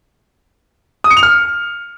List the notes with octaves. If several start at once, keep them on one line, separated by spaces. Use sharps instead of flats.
D#6
C#7
F7
F6